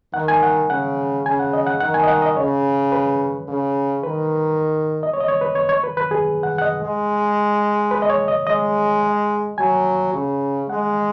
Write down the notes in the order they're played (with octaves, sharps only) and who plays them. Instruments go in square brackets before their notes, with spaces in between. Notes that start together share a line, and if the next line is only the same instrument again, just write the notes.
[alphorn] D#3 [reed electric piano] F#5
[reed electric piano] G#5
F#5
[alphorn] C#3 [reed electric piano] F#5
[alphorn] C#3 [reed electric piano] G#5
[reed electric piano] F#5
D#5
F#5
[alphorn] D#3 [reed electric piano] F#5
[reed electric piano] G#5
D#5
F#5
D#5
[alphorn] C#3 [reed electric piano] C#5
[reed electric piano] B4
[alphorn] C#3
[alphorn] D#3 [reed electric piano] B4
[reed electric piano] D#5
C#5
D#5
C#5
B4
C#5
C#5
B4
B4
G#4
F#5
F#5
D#5
[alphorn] G#3
[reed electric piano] B4
D#5
C#5
D#5
[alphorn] G#3 [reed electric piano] D#5
[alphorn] F#3 [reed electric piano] G#5
[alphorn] C#3
[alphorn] G#3 [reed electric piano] F#5